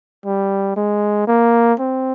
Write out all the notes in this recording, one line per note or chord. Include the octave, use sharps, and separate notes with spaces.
G3
G#3
A#3
C4